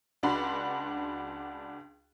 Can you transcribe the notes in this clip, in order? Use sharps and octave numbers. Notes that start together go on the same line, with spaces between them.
C#2 D4 F#4 B5 C6